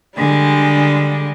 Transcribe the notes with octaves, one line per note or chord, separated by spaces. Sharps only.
D3 G3 G#3